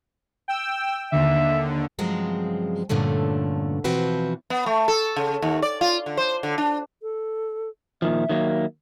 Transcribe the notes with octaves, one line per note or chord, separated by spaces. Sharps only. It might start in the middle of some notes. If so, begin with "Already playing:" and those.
G5 E6
D#2 D3 E5
G2 C#3 F3 F#3 G#3 C4
E2 G2 A#2 D3 A3 C#4
B2 E3 F3 C4 F#4 B4
B3
A3
A4
C#3
D#2
D5
F4
D3
C5
D3
D4
A4
A#2 D#3 F3 E5
D#3 F#3 A#3